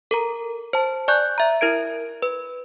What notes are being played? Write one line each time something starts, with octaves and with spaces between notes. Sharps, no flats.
A4 A#4 A#5
C5 A5
D5 G#5 C#6 F#6 G6
E5 A#5
E4 A#4 G#6 D7
B4